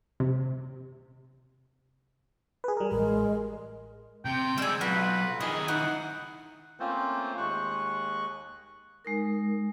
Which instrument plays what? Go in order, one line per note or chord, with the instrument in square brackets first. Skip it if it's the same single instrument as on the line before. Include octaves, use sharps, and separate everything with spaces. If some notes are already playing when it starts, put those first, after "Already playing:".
[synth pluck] C3
[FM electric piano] G#4 B4
G3 A#4
[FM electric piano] A1 [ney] G#3 [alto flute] A#4
[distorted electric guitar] C3 [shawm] G5
[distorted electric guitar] G#3 D5 [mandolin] G#5 E6
[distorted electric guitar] B1 [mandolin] F4 F#4 [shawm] B4
[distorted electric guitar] D#3 E4 [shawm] G#4 [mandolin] D#5
[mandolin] D#4 [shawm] F#5
[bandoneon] A3 A#3 C4 C#4 F4 C5
D#2 G#3 C#6 F#6
[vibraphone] G#3 D#4 A#4